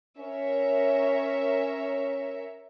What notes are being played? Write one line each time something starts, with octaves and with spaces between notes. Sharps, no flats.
C#4 A#4 C#5 E5